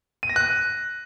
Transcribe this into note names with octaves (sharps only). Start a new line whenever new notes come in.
D#7
A#6
F#6